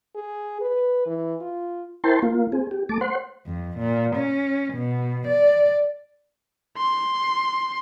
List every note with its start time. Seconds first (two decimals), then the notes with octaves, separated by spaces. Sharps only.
0.16 G#4
0.61 B4
1.07 E3
1.41 F4
2.04 E4 A#4 C5 G5 A5 C6
2.22 A#3 F4
2.52 C4 G#4
2.71 G4
2.89 A3 A5 D6
3.01 C5 F#5 C6
3.46 F2
3.79 A#2
4.16 C#4
4.74 B2
5.28 D5
6.78 C6